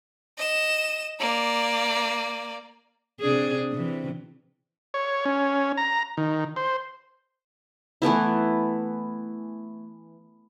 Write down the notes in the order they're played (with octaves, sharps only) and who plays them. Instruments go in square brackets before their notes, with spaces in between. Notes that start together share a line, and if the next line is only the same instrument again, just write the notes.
[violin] D#5 E7
A#3 D5
[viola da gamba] C3 D4 G#4
C3 E3
[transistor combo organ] C#5
C#4
A#5
D#3
C5
[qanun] E3 A3 B3 E4